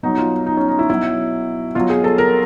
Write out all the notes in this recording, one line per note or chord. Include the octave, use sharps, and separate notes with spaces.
B2 F#3 D#4
F4
D#4
C#4
D#4
E4
B2 F#3 E4
B2 F#3 F4
G#4
A4
A#4